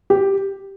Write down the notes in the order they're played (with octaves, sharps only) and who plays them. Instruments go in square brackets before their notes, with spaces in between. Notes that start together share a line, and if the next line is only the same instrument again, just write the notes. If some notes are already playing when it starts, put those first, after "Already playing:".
[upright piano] G4